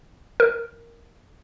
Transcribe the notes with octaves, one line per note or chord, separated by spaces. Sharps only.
A#4